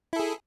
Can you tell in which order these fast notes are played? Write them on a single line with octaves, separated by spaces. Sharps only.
E4 A4 G#4